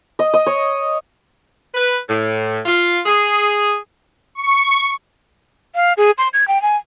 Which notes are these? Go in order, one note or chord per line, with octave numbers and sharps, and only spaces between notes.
D#5
D#5
C#5
B4
A2
F4
G#4
C#6
F5
G#4
C6
G#6
G5
G#5